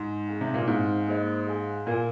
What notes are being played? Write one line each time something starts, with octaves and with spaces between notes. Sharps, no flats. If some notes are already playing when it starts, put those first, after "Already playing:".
Already playing: G#2
C4 G#4 F5 G#5
C3
A#2
G#2 C4 G#4 C5 F5 G#5
A#3 G#4 C5 D#5
G#4 F5 G#5
A#2 F4 A#4 F5 G#5